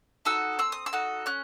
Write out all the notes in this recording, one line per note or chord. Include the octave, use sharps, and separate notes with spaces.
D#4 F#4 A4 E6
C4 E6
D#6
E6
D#4 F#4 A4
C#4 F#6